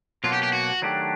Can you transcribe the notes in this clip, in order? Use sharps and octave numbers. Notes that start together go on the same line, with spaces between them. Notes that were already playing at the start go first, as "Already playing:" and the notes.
B2 F#3 A#3 F4
G4
G4
F#4
D#3 F#3 A3 D4 G4